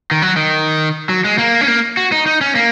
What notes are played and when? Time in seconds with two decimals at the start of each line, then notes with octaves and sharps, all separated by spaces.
0.11 D#3
0.22 F#3
0.36 D#3
1.09 F#3
1.25 G#3
1.38 A#3
1.61 C#4
1.68 A#3
1.97 F#4
2.12 D#4
2.26 D#4
2.41 C#4
2.55 A#3